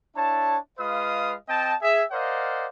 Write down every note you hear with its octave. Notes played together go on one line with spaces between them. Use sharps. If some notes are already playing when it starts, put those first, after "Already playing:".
D4 E4 C#5 A5
G#3 F4 B4 D#5 F5 D#6
C4 D#5 G5 A5
G#4 E5
A#4 C5 D5 D#5 F5 F#5